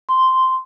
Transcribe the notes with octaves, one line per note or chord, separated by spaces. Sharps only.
C6